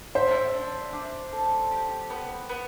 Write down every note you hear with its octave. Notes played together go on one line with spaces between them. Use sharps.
C5 E5
D4
D4
A4
G4
B3
B3